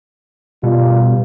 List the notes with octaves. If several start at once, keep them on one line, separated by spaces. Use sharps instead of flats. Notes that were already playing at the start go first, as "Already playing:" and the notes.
B2 G3 F4